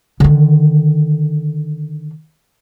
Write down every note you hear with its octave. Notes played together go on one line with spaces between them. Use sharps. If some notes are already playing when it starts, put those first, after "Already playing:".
D3 D#3